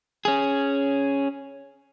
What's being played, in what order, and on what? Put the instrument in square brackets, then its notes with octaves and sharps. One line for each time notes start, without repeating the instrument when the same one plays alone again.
[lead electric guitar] C#4 G#4